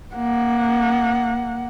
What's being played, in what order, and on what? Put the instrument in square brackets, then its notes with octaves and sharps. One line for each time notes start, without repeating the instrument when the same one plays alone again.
[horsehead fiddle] A#3 F#5